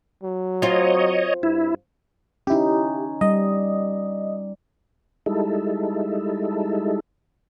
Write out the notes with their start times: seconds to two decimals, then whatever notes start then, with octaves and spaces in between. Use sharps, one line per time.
0.23 F#3
0.62 C4 F4 C#5 D#5
1.43 G2 E4
2.47 C#4 D#4 E4 G4
3.21 G3 D#5
5.26 G3 G#3 D#4 E4 A4